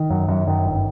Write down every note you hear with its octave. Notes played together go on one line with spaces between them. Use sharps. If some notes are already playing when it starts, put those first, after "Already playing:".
Already playing: D#3
F#2
F#2
F#2 D#3
G1